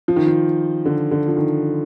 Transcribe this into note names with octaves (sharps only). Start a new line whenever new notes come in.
F3
D#3
F3
D3
D3
F3
D#3